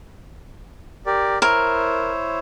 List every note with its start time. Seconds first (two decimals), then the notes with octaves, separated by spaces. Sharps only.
1.06 G4 A#4 D5
1.42 E4 A#4 C5 C#5